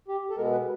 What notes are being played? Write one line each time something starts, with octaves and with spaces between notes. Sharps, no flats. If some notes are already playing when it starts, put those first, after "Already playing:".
G4
A4
B2 G#3 B3 A#4
B4